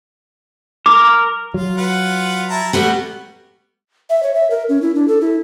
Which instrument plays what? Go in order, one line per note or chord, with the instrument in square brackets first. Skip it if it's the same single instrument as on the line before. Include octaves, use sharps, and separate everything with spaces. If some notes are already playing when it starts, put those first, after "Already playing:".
[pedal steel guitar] A#4 [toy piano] D6
[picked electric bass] F#3 [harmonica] F4
[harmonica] F4 B4 F#5
E4 A5 A#5
[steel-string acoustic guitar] G3 A3 B3 [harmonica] F#4 F#5
[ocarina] E5
C#5
E5
A#4
C#4
E4
D4
A4
E4